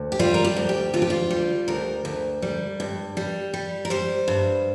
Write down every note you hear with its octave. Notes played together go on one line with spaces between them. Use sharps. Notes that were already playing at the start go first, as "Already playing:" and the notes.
Already playing: D2
G4
G3 F4
A#4
G4
D2
G4
D2 F4
G4
F4
G3
D2 A#4
D2
G3
G2
G3
G3
A#4
G3 C5
G2